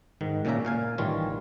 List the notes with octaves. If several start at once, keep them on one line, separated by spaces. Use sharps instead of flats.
G#2 D#3
A#2 C#3 A#3 C#4 E5 A#5
A#2 F5 G#5
A1 D#3 E3 G3 F4 C#5